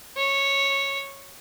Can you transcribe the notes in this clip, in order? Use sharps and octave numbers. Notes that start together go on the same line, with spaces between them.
C#5